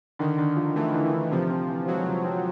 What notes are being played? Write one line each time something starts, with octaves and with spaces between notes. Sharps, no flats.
D3 D#3
D3
F3
E3 A3
D3
D3
C3 F3
C4
E3
F#3 G#3
C3
C4